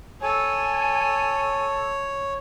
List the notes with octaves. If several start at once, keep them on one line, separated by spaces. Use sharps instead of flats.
A4 C#5 G#5